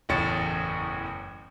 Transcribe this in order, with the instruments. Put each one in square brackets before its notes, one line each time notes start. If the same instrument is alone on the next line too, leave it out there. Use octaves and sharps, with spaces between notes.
[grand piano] F#1 E2 A2 C#5 A6 C#7